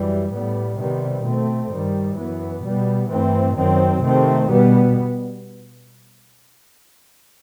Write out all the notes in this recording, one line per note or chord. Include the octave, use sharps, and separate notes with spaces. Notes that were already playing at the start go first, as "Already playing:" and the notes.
Already playing: F#2 E3 G3
A2 G3 B3
C3 D#3 G3 B3
B2 A3 C4
G2 D#3 G3
F#2 E3 B3
B2 G3 B3
G2 E3 A3 C4
F#2 D#3 F#3 C4
C3 D#3 A3 C4
B2 G3 B3